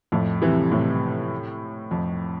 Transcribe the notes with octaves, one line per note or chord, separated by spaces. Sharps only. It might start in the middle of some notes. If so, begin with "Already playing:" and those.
F2 A2
C3 E3
A2 C3
F2